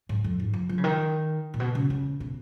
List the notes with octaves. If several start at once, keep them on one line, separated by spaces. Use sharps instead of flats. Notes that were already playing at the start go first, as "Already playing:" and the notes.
G#2
F2
G#2
F3
F3
C#3
D#3
A#2
B2
C#3
C#3
B2